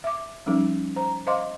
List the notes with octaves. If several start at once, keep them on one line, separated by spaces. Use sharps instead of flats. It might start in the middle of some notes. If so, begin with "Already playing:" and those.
E5 D6
F3 G3 C#4 D#4
C5 A#5
C5 D#5 F5 C6 D6